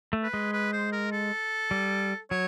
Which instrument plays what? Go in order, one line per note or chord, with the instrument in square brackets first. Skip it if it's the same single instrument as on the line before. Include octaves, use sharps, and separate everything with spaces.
[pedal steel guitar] A3
[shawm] B4
[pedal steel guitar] G#3
[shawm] B4
C5
A#4
A4
[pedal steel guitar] G3
[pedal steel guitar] F#3 [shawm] C#5